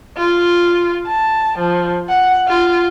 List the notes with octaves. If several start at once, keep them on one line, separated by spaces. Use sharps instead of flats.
F4
A5
F3
F#5
F4